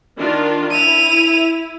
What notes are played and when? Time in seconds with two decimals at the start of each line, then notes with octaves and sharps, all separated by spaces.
0.18 D#3 D4 F4
0.71 E4 D#7 F7